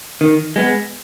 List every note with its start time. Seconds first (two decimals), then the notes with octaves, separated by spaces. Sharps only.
0.21 D#3
0.56 G#3 B3